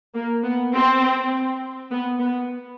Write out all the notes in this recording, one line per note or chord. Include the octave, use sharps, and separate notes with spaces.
A#3
B3
C4
B3
B3